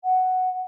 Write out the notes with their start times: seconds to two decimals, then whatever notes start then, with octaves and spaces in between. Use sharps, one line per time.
0.04 F#5